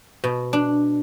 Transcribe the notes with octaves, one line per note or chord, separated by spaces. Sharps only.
B2
D4